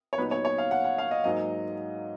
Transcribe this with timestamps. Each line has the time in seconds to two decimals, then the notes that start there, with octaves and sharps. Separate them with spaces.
0.13 C#5
0.18 A#2 F#3 B3 D#4 B4
0.31 C#5
0.45 C#5
0.58 F5
0.71 F#5
0.84 F#5
0.98 F5
1.11 D#5
1.24 G#2 F#3 A#3 D#5